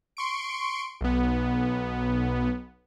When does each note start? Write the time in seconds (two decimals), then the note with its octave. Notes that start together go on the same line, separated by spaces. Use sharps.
0.17 C6 C#6 D7
1.01 B1 B3